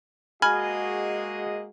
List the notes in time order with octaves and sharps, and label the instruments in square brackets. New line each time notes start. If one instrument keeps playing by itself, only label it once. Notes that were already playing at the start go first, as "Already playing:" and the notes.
[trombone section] G#3 F#4 [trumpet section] A#3 G#4 D#5 [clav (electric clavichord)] G#5 [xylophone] B5 F6